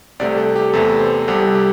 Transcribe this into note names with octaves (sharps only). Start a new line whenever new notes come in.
C2 C3 A3 D5
A4
G4
E2 C3 E3 A3 A4
C5
C2 C3 G3 A4
G4